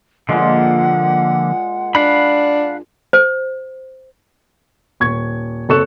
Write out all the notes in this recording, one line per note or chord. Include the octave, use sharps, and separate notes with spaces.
A#2 D3 F3 G#3 A#3 F#5
D4 F5 F#5 B5
C5
D#1 C#6 G#6
F#1 C4 A4 C#6 F#6 E7